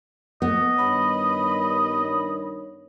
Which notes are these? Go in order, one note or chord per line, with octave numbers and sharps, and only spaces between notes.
B3 D#5
G2 D#3 C#5 B5